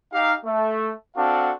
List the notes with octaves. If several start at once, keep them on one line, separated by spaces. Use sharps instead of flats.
D#4 G4 F5
A3
C4 D4 F#4 A4 F5 F#5